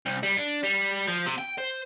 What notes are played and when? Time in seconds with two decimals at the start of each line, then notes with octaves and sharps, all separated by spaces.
0.06 C2
0.23 G3
0.37 D4
0.63 G3
1.07 F3
1.26 C3
1.38 G5
1.58 C5